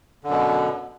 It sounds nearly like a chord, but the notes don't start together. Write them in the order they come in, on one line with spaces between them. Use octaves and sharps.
D3 F#2 B2